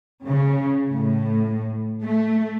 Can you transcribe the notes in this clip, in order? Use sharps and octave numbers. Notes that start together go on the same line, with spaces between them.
C#3
A2
A3